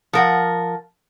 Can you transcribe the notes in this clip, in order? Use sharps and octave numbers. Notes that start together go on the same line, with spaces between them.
F3 A#4 F#5